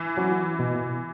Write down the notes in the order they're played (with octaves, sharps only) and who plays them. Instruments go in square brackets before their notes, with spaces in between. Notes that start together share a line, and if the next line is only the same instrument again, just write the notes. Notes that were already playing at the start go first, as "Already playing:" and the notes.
Already playing: [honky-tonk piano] E3
[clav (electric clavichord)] F#3 C#4
B2